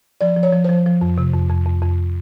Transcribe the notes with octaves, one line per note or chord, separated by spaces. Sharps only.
F3 D5
F3
C#5
F3
F3 C5
F3
F2
C3
F2
F2
F2
F2